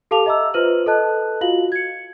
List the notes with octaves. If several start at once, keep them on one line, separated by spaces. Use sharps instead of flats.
G4 A4 F5 A5 D6 F7
D#5 E5 A#5 D6 E6
F4 B4 C5 F6 D#7 F#7
A4 B4 D#5 A5 F#6
F4 F#4 F5 F#7
G#6 C#7